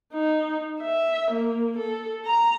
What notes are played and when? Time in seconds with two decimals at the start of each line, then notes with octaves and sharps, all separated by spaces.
0.13 D#4
0.80 E5
1.31 A#3
1.78 A4
2.26 A#5